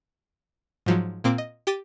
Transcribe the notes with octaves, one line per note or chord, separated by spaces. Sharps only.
G#2 F3 F#3
A#2 A#3 C4 D6
D#5
G4 G5 D6 A6 D#7